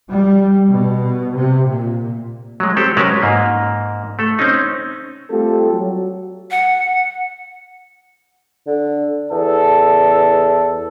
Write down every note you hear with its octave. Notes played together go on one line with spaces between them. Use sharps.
G3
B2
C3
A#2
F#3 G#3
C4 G4 A4
F#3 G#3 C#4 A#4 B4 A5
G#2 A#3
A3 A4
C4 C#4 D#4
G3 A3 C4 F4 G4 A4
F#3
F#5
D3
E2 A4